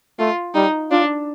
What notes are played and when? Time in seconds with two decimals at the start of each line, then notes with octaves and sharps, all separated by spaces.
0.19 A3 F4
0.54 G3 D#4
0.91 D4 F4